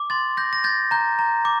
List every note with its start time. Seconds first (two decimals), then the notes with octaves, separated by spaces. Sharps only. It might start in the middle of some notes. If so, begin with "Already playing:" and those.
Already playing: D6
0.10 C6 A6
0.37 G6 A#6
0.53 A#6
0.64 G6 A6
0.91 A#5 G6
1.19 A#5
1.45 D6